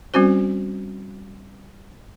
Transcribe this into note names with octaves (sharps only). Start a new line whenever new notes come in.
G3 C4 C#4 F#4 C5